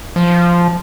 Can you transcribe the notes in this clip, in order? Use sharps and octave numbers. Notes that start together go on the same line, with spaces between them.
F3